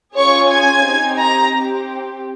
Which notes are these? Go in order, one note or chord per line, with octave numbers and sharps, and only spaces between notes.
C#4 F4 G#4 C#5 C#6
G#5 G#6
C4 D#4 G4
A#5 A#6
C4 G4